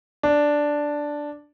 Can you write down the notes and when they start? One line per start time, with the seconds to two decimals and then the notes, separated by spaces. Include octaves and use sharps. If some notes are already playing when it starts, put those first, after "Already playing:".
0.23 D4